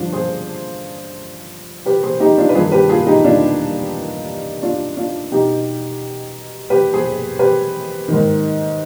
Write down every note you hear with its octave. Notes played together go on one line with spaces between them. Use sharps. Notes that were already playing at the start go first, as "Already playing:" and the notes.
Already playing: G2 D3 F3 D4 F4
G#4 C5
G4 B4
G#4 C5
D#4 G4
D4 F4
B4
G2 D#3 F4 G#4
G4 B4
F4 G#4
D#4 G4
D4 F4
D4 F4
D4 F4
B2 D#4 G4
G4 B4
G#4 C5
G4 B4
G#2 D#3